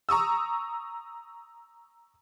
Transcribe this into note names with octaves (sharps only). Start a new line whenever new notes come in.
A#5 C#6 D#6 E6